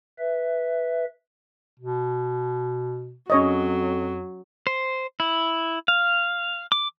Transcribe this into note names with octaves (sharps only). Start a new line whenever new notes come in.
B4 E5
B2
F2 F#3 C#4 C#5 D#5
C5
E4
F5
D6